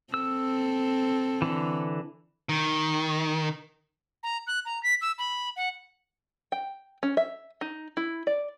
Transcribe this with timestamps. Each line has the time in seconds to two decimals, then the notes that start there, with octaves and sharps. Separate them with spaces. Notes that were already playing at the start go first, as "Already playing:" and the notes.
0.14 C4 A4 E6
1.42 D3 E3
2.49 D#3
4.23 A#5
4.47 F#6
4.65 A#5
4.83 B6
5.01 E6
5.18 B5
5.56 F#5
6.52 G5
7.03 C#4
7.17 E5
7.61 D#4
7.97 E4
8.27 D5